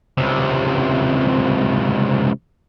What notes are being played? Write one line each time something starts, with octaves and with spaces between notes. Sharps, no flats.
C#2 C3